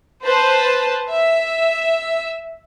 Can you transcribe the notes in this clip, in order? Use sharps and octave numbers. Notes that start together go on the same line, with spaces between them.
B4 C5 A5
E5